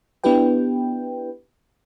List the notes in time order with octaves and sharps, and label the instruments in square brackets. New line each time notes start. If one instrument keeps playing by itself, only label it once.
[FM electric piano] B3 D4 E4 G4 B4 G5